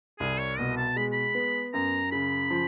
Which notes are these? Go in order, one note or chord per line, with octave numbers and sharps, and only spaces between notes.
C2 G#4
C#5
B2 D#5
A5
G#3 B5
B5
B3
F#2 A#5
C#3 B5
F3